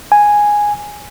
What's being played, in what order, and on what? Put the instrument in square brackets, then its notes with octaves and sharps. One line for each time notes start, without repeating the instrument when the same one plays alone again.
[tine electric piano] G#5